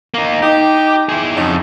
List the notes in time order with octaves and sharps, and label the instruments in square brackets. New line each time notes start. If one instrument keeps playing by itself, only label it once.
[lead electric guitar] A#3 D#4
[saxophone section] D#4 [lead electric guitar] G4
[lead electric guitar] E4 G#4
[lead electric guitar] F2 [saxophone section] C#3 F#3 D#4